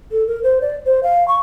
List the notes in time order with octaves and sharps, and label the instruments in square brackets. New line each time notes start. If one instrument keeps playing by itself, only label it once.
[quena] A4
A#4
C5
D5
C5
F5
C#6